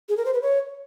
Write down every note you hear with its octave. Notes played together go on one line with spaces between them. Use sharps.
G#4
A#4
C5
B4
C#5